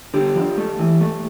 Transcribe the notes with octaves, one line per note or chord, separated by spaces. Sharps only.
D3 G4
F3
A3
E3
A3